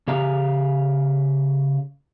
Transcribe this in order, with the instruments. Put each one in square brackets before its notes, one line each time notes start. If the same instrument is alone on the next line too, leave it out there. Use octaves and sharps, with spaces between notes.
[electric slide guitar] C#3 G4 F5 A#5